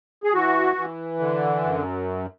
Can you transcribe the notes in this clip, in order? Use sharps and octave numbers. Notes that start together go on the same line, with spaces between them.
G#4
E3 F#4
E3
D3
F#2